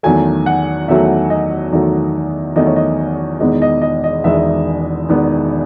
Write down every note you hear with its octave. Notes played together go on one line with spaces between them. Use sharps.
E2 D#3 F#3 A3 G#5
F#5
E2 D#3 F#3 A3 E5
D#5
E2 D#3 F#3 A3
E2 D#3 F#3 A3 D#5
C#5
D#5
E1 E2 D#3 G#3 B3 D#5
D#5
D#5
D#5
E1 E2 D#3 G#3 B3 E5
E1 E2 D#3 G#3 B3